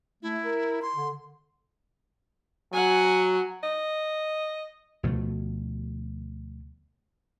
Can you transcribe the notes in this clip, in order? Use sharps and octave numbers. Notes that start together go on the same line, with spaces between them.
A3 E4
A#4
C6
D3
F#3 F#5 G#5
D#5
D2 B2 F3 A3